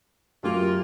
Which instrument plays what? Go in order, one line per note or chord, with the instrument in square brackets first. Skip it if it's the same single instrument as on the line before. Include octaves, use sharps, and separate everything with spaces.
[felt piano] F#2 [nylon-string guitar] A3 G4 [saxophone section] A#3 F4